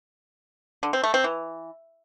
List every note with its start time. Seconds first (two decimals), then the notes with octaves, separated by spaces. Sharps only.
0.83 D3
0.93 C4
1.04 A3
1.14 C4
1.24 E3